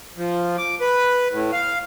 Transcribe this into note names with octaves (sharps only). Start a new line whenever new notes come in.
F3
D6
B4
A2
F5